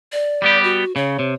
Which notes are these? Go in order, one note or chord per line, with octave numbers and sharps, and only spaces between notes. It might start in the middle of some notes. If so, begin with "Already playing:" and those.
D5
G3 B3 G4
F#4
C#3 C#5
C3